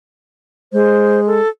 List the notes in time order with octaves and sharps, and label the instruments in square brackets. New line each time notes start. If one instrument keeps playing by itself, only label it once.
[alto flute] G#3 [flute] C5
[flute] A4